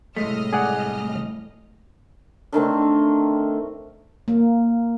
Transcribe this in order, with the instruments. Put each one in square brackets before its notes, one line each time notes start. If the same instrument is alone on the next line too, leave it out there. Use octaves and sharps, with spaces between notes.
[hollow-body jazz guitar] C2 G#3 A3 [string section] A2 D#5 F6
[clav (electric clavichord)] G#4 D5 F#5
[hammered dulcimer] D3 D#3 A3 C4
[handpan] A#3